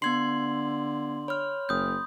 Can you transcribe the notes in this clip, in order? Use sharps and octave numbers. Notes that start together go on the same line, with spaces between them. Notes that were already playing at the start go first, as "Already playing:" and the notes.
D3 B3 C6 G#6 C7 F#7
C#5 B5 F6
F#1 D#6 G6